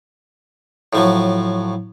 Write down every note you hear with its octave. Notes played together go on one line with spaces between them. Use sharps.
A2 F3 F#3